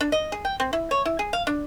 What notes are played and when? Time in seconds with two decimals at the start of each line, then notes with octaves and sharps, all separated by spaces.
0.01 D4
0.12 D#5
0.32 G#4
0.45 G5
0.60 C4
0.73 E4
0.91 C#5
1.05 E4
1.19 G#4
1.33 F5
1.47 D4